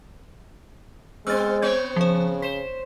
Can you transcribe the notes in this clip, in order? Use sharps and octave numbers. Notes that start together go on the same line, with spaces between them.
G#3 B3 C4 E6 F6 A6
B3 C4 C#5 G6
C#3 F3 C5
C5 B6 E7